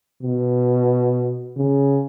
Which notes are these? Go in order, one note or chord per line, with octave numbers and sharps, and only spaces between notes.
B2
C#3